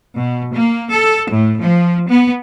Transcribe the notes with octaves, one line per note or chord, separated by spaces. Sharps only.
B2
A#3
A4
A2
F3
B3